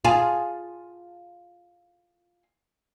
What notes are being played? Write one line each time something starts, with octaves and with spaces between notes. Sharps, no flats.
F4 G#4